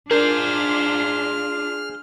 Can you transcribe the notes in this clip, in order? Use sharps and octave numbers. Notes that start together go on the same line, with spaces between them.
D4 F4 G#4 A#4 C5 F6 G6